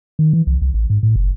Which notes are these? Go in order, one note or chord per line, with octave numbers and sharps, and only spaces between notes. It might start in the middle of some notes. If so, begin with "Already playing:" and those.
D#3
E3
C2
C2
A1
G#2
A2
F#1